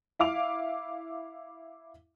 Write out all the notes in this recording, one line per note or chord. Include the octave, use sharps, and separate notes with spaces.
E4 F5 D6 F7